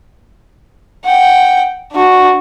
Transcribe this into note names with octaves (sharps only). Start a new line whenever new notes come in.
F#5 G5
D4 F#4